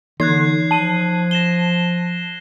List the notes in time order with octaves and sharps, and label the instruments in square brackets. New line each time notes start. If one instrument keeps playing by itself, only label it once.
[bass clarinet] D3 [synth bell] E3 D#4 [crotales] F#6 G#6 C7
[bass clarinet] F3 [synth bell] A5 D#7
[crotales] A#6 E7 G7